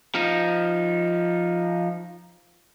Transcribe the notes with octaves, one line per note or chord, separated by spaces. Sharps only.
F3 D#4